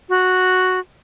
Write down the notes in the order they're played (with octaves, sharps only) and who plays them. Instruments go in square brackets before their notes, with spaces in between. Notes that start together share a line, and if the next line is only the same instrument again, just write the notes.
[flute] F#4